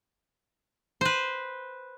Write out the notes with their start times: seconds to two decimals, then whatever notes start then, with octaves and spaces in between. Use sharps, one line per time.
1.01 B4 C5